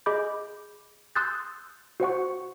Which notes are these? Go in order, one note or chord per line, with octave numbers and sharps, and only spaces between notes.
G#4 D#5 B5 D6 G6
C6 D#6 E6 F#6 G6 A6
F#4 C5 F#5 C#6